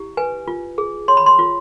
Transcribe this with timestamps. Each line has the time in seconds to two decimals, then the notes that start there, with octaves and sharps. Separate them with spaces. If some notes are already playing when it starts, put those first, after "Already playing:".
Already playing: E4 G4
0.17 B4 G#5
0.48 F4
0.78 G#4
1.08 C#5 C6
1.17 B5
1.26 C6
1.39 F4